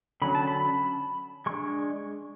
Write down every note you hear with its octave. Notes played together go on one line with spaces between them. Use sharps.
D3 F#3 C#4 B5
A5
B5
G#3 D4 C#6